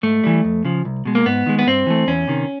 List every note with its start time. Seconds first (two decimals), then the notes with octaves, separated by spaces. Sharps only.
0.03 G#2 A3
0.24 E3 G3
0.44 F2
0.65 C#3 F3
0.85 C2
1.05 B2 G#3
1.15 A#3
1.25 G#2 B3
1.46 D#3 G#3
1.59 B3
1.67 G2 C4
1.87 E3 A3
2.08 E2 C#4
2.28 C3 D#3